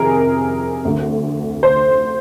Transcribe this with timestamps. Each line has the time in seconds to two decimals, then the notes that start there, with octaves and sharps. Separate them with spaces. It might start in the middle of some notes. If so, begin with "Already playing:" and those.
Already playing: F2 C3 D#3 G#4 A#4
0.85 D2 D3
1.63 C5